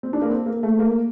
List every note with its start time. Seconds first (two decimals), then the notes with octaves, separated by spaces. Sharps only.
0.03 C4
0.13 D4
0.22 A#3
0.30 C4
0.46 A#3
0.63 A3
0.79 A#3